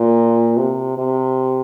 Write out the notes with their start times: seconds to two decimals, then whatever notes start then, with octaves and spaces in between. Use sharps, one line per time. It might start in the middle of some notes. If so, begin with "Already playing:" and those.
Already playing: A#2
0.57 C3
0.98 C3